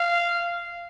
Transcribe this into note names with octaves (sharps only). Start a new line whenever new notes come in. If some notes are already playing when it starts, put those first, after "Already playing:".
Already playing: F5